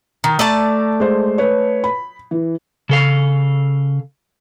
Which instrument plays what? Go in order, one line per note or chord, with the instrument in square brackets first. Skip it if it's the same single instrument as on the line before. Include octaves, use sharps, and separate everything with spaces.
[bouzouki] D#3 [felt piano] A#5
[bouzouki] A3 D5 A5
[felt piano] G#3 C5
B4 C#5
B5
E3
[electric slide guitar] C#3 A4 F5